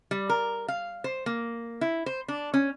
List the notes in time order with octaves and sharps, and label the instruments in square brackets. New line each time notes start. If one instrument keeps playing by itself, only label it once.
[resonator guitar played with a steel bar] G3
A#4
F5
C5
A#3
E4
C5
D4
C#4